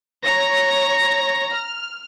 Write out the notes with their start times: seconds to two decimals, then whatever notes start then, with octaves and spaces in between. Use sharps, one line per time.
0.24 C#5 A#5 A#6
1.52 F6